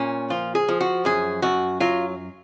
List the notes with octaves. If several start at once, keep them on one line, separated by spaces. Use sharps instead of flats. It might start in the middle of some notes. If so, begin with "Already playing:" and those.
Already playing: A#2 C#4
F3 F4
G#4
F3
F#4
F#2 G#4
F#2 F#4
F#3 F4